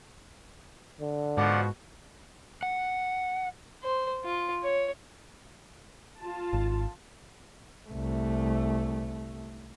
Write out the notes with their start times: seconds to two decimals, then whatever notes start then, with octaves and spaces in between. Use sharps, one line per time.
1.00 D3
1.37 G#2 B2 F3 F#4 D5 F#5
2.63 F#5
3.83 C5
4.25 F4
4.63 C#5
6.19 F4 A5
6.53 G#1
7.89 C2 A3